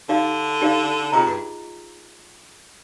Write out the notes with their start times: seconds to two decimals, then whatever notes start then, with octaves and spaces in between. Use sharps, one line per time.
0.09 D3 D#4 G4 D5 F5
0.61 D#4 G4 D5 F5
1.12 C3 F4 G#4 D#5 A#5
1.26 G2